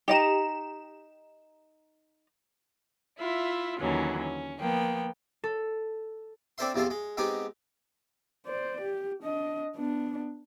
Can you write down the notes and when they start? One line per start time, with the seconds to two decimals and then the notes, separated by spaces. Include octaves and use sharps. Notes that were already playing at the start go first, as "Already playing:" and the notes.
0.08 D#4 G4 D#5 A#5 E7
3.19 E4 F4 E5
3.80 D#2 D3 E3 F#3 C#4
4.18 C#4
4.60 F3 A#3 B3 G5
5.44 A4
6.58 C4 D4 A4 C5 E5 C6
6.74 E2 C3 F3 A4 C5
6.90 G#3
7.17 G#3 B3 C4 D#4 G4
8.46 C5 D5
8.81 G4
9.23 D4 D#5
9.76 B3 D4